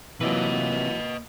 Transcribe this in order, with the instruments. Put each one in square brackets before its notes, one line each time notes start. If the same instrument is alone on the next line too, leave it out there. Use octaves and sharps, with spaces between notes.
[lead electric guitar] C3 F4 [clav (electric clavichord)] E3 F#3 [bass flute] A#3 [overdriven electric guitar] B4 D#5